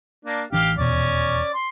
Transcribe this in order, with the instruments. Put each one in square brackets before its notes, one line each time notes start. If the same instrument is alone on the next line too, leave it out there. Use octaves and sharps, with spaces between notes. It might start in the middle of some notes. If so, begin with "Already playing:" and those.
[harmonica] A#3 D4
[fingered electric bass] A1 E3 D4 [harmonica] G4 F5
[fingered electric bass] D#1 E2 B2 [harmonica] C#4 D5
[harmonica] C6